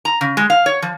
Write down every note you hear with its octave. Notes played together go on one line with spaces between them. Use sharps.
A#5
C#3
G#3
F5
C#5
F3